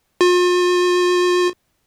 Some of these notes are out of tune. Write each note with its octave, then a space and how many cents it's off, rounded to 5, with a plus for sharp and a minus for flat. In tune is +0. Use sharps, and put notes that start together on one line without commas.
F4 +40